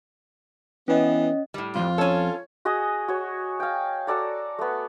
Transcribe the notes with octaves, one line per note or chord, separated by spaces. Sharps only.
E3 B3 C#4 D#5
A2 G3
C2 F2 F4
C#4 A4 C#5
F#4 G#4 D#5 D#6
F#4 C#5
F5 G5
F#4 A4 D5 A#5
A3 B3